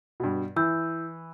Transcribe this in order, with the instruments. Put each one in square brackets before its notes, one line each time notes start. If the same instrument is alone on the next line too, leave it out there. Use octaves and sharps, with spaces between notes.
[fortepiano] G2 B2
[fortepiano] E3 [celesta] E4 E6 G6